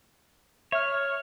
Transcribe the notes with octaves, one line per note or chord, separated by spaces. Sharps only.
C#5 E5 F6